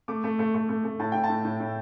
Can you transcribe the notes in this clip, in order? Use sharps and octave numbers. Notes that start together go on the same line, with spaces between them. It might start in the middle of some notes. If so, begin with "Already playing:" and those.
A3 D6
A3
A3
A3
A3
A3
A2 A5
A2 G5
A5
A2
A2
A2